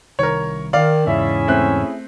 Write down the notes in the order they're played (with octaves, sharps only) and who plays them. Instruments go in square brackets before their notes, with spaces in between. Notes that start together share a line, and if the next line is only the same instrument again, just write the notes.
[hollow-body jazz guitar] C2 D#3 [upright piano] A#4 C#5
[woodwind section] D#3 [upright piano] D5 F5
[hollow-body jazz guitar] E2 G#2 C#3 [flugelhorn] C#4 [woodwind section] E4 G#4 E5
[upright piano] A3 C4 F#6